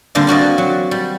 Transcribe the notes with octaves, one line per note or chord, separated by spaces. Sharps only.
D3 G3 A#3 C4 D4
F4 F#4 D5 D#5
F#3
G3